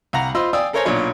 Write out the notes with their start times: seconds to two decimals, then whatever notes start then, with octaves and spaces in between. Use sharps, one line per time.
0.13 C2 F5 F#5 A#5
0.35 F4 C5 D#5 B5 C6 E6
0.53 D5 F5 G5 G#5 D#6 E6
0.73 A4 A#4 C5 C#5 G#5 A#5
0.85 B1 A#2 D4 C#5